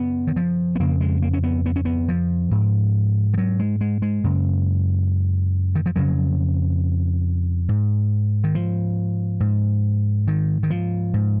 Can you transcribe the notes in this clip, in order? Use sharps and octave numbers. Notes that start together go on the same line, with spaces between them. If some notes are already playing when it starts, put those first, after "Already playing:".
Already playing: F#2 C#3 B3
D#3
F3
B3
F2 C#3 A#3
G#3
A#3
C#4
B3
B3
C#4
B3
F3
G#2
F3
F#3
G#3
G#3
G#3
F#2 C#3
D#3
F3
F2 C#3 F#3
G#2
D#3
F3
G#2
D#3
D#3
F3
G#2